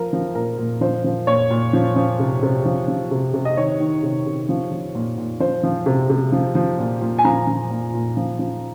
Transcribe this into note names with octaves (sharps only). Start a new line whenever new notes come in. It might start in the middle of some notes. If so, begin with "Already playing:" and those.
Already playing: F3 A#4
F3
A#2 A#4
A#2
F3 C5
F3
A#2 C#5
A#2
F3
F3
C3
C3
F3
F3
C3
C3
D#5
D#3 C#5
D#3
C3
C3
F3
F3
A#2
A#2
F3 C5
F3
C3
C3
F3
F3
A#2
A#2
G#5
F3 A#5
F3
A#2
A#2
F3
F3